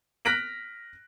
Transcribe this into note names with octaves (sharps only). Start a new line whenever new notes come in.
F6 F#6 A#6 B6 D7 F#7